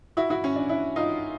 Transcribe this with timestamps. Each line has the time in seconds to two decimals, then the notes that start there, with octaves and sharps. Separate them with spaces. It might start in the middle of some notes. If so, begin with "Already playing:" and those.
0.17 E4 F#4
0.30 E4 F#4
0.44 C#4
0.56 D4
0.69 D4 E4
0.96 D#4 F4